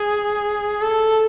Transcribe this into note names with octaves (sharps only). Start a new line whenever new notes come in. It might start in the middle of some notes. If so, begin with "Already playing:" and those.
Already playing: G#4
A4